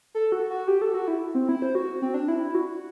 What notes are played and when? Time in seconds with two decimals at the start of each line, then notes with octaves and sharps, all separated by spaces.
0.15 A4
0.32 F#4
0.50 F#4
0.68 G4
0.82 A4
0.94 F#4
1.08 E4
1.35 C4
1.49 E4
1.62 C5
1.75 F#4
2.02 C4
2.14 D4
2.28 E4
2.55 F#4